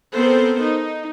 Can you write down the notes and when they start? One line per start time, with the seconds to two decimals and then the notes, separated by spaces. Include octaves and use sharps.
0.14 B3 C4 A4 A#4 C5
0.64 D#4